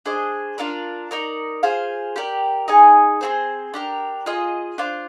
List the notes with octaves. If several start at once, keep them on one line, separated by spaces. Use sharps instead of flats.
D4 G#4 C5 D#5
D4 F4 A#4 D5
D#4 A#4 D5
F4 G#4 C5 F5
G4 A#4 D5
D#4 G#4 D#5 G#5
C4 D#4 G#4 C5
D4 G4 A#4
F4 G#4 D#5
D4 F4 C5